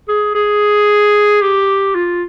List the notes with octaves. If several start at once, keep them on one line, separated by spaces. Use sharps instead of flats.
G#4
G#4
G4
F4